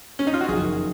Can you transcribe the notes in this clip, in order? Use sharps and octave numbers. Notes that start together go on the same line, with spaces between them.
C#4
D#4
F4
F#4
F#1 F2 D#3 F#3 G#4